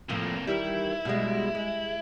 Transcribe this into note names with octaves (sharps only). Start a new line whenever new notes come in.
F2 A2 C3 F3 A#3
D#3 E3 G3 E4
B2 G3 G#3
G#3